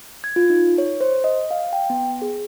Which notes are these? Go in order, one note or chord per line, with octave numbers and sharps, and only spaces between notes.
G#6
F4
D#4
C#5
C5
D#5
F5
G5
B3
G#4